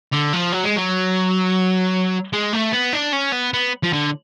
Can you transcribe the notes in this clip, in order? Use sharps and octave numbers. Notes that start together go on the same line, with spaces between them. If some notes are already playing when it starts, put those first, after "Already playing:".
D3
F3
F#3
G#3
F#3
G#3
A3
B3
D4
C#4
B3
B3
F3
D3